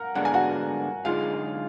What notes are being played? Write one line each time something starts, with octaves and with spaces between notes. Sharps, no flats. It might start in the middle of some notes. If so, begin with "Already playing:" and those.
Already playing: A#4 F#5 A#5
D3 G#3 B3 D4 F#5
G#5
F#4 F#5
F#2 D3 G#3 D#4 F4 G#4 F5